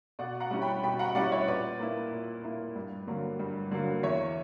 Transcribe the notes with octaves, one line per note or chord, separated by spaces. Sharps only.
B2 D5 F#5
F#5 A#5
G3 C#4 E4
G5 B5
B2 G5 B5
F#5 A#5
G3 C#4 E4 D5 F#5
C#5 E5
A#2 B4 D5
A#3 E4
A#2
A#3 E4
G2
D3 F#3 A#3
G2
D3 F#3 A#3
E2 C#5 E5